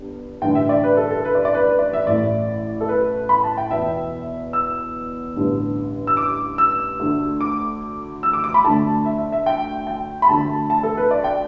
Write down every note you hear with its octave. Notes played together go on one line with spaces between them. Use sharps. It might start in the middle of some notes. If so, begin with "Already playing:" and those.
Already playing: G1 G2 G3
A1 G2 D3 G5
E5
D5
B4
A4
A4
B4
D5
D5
B4
B4
D5
E5
A1 A2 A3 D5
A4
B4
B5
A5
G5
E2 B2 B3 E5
E6
A1 G2 D3 G3 B3
E6
D6
E6
D2 D3 A3
D6
E6
D6
D6
B5
D2 D3 A3 A5
E5
E5
E5
G5
G5
B5
D2 D3 A3 A5
A5
A4
B4
D5
G5